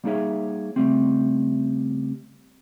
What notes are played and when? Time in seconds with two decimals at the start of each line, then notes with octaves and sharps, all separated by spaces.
0.04 G3 A#3 D#4 G#4 C#5 E5
0.76 C#3 G3 A3 C4